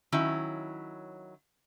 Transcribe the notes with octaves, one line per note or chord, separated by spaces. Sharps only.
D#3 F#3 C#4 E4